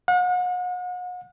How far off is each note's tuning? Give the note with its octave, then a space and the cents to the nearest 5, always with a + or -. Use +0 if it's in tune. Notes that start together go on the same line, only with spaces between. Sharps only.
F#5 -40